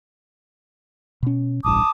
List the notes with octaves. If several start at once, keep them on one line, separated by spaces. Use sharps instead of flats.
B2 C#4
E1 A1 G2 A5 D6 D#6